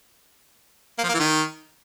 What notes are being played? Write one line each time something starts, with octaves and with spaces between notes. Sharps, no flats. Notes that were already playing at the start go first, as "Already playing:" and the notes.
A#3
F3
A#3
E3
D#3